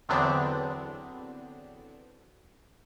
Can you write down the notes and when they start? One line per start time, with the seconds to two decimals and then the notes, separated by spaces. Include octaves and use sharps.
0.09 E2 D3 F#3 B3 C4 D4